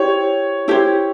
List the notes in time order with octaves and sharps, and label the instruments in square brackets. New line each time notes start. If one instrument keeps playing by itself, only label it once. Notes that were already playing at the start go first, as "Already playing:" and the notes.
Already playing: [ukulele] E4 G4 C5 [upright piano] C#5
[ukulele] E4 G4 C5